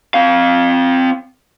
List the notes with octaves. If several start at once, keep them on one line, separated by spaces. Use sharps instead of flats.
C4 F5